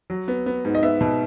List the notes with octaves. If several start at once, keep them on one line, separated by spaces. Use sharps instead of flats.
F#3
B3
B3
G#2
D#5
B3 E5
B2